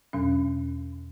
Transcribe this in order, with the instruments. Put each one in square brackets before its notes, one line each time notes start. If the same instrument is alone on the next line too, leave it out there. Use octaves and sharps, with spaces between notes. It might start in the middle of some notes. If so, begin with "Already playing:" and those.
[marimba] E2 B2 F#3 C#4